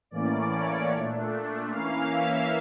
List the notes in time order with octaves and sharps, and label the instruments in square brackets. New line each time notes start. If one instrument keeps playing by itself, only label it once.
[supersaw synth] A2 E3 A#3 C#4 D5
C#5
A#2 A3 D4
E3 A#3 C#4 F5
E5